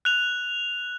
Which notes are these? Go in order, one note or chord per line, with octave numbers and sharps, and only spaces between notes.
F#6 F7